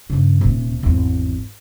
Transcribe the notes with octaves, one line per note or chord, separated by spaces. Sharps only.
G2 C#3
D#1 C3
G#1 E2